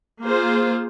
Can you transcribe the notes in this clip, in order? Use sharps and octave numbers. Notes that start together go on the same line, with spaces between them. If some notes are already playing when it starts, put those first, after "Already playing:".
A#3 F4 G#4 C5